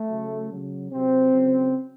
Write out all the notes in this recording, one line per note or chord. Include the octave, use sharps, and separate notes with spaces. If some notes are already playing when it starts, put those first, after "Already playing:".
Already playing: A3
C#3 F#3
C#3 F#3
C3 F#3 C4
C#3 F#3